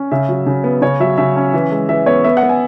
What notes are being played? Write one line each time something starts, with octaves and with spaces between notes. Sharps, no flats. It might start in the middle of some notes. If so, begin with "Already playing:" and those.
Already playing: C#4
C#3 E5
F#3
C#3
B3
C#3 C#5
F#3 E5
C#3 E5
C#4
E3
G#3
E3 E5
B3 C#5
B3 E5
F#5
B3
G#5